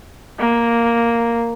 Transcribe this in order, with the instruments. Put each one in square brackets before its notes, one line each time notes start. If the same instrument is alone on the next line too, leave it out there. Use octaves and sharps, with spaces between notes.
[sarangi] A#3